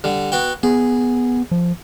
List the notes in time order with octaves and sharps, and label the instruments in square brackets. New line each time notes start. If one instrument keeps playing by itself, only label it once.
[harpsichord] D3 G3
B3 F#4 G5
[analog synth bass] B3 [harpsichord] G#4
[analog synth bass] F3